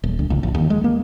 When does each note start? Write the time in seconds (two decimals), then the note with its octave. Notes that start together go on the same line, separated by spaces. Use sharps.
0.04 D#1
0.19 D2
0.30 C#2
0.43 A1
0.55 D#2
0.70 G#3
0.84 A#3